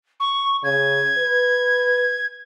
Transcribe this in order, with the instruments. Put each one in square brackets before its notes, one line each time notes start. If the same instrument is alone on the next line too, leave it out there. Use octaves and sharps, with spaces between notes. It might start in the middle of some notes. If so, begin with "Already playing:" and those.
[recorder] C#6
[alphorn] C#3 [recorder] G#6
[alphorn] B4